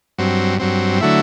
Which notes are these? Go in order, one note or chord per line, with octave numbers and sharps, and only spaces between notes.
G2 F#3 C4
G2 F#3 C4
D3 F#3 A3 E4